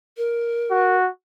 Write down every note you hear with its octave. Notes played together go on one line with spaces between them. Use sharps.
A#4
F#4